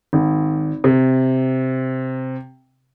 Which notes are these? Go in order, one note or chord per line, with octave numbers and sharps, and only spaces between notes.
G#1
C3